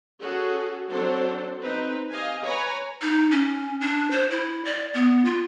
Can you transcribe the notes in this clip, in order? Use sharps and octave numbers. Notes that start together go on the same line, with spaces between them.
C#4 F#4 G#4 A4
F#3 C4 D4 A4 C5
C4 D#4 B4
G4 D#5 F5 G#5
B4 C#5 G#5 A#5 B5
D#4
C#4
D4
C5
E4
D5
B3
F4